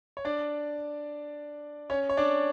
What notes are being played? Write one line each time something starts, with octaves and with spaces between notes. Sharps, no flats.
C#5
D4 D5
C#4 C#5
C#5
D4 D5